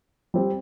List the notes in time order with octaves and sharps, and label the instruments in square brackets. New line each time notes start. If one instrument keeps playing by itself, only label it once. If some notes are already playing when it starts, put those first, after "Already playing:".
[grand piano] G3 C4